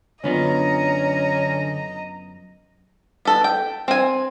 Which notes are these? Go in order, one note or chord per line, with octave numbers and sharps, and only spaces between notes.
F#2 D3 B3 C#4 F4 D#5 A#5
B3 A4
G5
C4 G#5